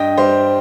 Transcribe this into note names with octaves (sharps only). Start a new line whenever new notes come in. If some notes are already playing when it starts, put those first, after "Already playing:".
Already playing: G2 D#5 G5
G3 C5